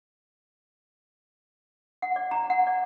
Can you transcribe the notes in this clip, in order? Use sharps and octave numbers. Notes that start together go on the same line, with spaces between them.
F#5
D5
A#5
F#5
D5